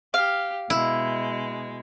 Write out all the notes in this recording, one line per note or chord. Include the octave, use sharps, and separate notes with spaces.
G4 F5
B2 G#3 E4